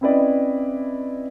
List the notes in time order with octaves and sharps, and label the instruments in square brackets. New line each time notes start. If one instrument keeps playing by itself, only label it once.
[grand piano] C4 C#4 E4 B4 D5 D#5